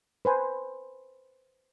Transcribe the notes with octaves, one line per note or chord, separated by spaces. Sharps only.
B4 C5 G#5